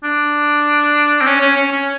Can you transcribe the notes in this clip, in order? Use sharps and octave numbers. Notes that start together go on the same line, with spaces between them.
D4
C4
C#4
C#4
C#4
C#4